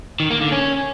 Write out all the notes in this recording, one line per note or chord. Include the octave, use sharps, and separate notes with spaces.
D#3
A#3
D3
C#4